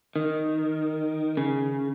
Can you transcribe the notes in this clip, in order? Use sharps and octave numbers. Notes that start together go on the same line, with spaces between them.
D#3
C#3